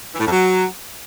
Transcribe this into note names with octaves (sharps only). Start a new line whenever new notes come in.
E3
A2
F2
F#3